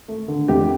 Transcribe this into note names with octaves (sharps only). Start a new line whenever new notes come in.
A3
D3
F2 G4